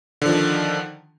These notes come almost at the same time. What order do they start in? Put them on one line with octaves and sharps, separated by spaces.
D3 F3 D#3